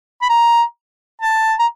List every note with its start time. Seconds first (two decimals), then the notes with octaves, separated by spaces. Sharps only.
0.22 B5
0.30 A#5
1.21 A5
1.59 A#5